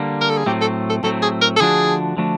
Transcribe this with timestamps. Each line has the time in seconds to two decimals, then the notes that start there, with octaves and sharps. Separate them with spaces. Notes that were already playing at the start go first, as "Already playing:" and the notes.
Already playing: D3 G3 A#3
0.21 A#4
0.30 A4
0.37 G#4
0.46 A2 F#3 A3 C4 G4
0.61 A4
0.90 A4
1.03 A2 F#3 A3 C4 A4
1.22 G#4
1.41 A#4
1.56 A4
1.60 D3 F3 A3 D4 F#4 G#4
2.17 D3 F3 A3 D4 F#4